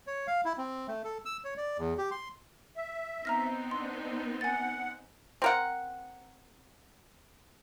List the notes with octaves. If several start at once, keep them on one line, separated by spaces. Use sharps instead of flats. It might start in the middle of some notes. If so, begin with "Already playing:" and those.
C#5
F5
E4
C4
A3
A4
E6
C#5
D5
E2
G4
C6
E5
B3 C4 D#4 A#5 F6 A#6
D4 C6
F#5 G#5 A6
C4 A#4 F#5